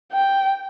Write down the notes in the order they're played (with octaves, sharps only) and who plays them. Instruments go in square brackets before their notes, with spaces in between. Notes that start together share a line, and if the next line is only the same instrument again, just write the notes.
[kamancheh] G5